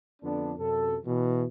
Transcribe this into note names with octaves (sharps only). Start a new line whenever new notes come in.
F2 D3 B3 D4
F#2 C3 A4
B2 E3